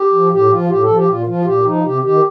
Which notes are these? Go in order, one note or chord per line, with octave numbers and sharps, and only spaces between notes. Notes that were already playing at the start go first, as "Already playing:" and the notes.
Already playing: G4
F3
A2 G4
F3 F4
A2 G4
A4
F3
G4
A#2 F4
F3 F4
A#2 G4
F3 D#4
C3 G4
D#3 G4